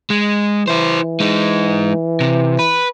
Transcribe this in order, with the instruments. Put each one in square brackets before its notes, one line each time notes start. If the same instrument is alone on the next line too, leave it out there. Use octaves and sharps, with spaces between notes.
[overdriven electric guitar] G#3
[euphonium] E3 [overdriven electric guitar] E4 C5
[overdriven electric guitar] G#3 D#4
C3
B4